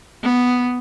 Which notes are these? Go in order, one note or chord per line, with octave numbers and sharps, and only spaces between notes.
B3